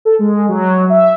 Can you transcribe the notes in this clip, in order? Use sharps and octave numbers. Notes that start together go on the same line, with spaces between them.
A4
G#3
F#3
E5